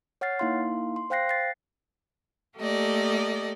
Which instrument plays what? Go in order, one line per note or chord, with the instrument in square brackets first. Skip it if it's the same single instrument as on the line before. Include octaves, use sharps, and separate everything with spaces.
[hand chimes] C#5 F#5 F6 A6 C7
A#3 D#4 E4 F5 C6
C6
C5 F5 G5 F#6 A#6 C7
A6 C7
[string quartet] A3 A#3 G4 A4 D5 D#5